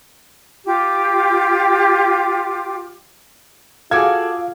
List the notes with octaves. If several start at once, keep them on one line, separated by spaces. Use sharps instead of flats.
F4 G4 G5 D6
F4 F#4 G#4 A4 F5 D6 G#6